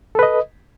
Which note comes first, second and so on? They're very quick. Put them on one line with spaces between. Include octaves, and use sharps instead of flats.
A4 B4 D#5